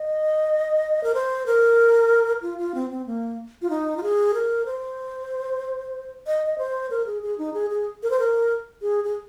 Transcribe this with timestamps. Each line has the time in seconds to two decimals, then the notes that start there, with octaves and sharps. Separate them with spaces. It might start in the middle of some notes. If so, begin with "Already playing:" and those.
Already playing: D#5
1.04 A#4
1.14 C5
1.46 A#4
2.42 F4
2.58 F4
2.75 C4
2.90 C4
3.06 A#3
3.62 F4
3.70 D#4
3.97 F4
4.03 G#4
4.34 A#4
4.66 C5
6.27 D#5
6.46 D#5
6.58 C5
6.91 A#4
7.07 G#4
7.23 G#4
7.38 D#4
7.54 G#4
7.70 G#4
8.03 A#4
8.11 C5
8.19 A#4
8.82 G#4
9.04 G#4